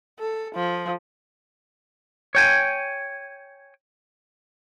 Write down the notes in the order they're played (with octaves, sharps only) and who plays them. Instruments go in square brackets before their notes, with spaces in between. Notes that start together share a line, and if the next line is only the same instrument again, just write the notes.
[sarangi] A4
F3
[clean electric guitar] C#5 G5 G#5